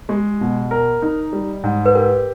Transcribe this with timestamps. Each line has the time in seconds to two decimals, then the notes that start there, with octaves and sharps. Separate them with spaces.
0.09 G#3 G4
0.41 B2
0.71 A#4
1.02 D#4
1.33 G3
1.64 G#2
1.86 B4
1.95 G4 A#4